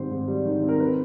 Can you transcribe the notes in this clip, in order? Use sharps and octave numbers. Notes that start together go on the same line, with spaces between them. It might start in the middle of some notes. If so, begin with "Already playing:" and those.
Already playing: G#2 D#3 G3 C4 C5
G#2
G3
D#3
C4
A#4
B4